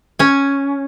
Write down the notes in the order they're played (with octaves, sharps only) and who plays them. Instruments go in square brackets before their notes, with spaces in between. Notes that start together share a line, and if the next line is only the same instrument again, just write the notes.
[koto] C#4 G#5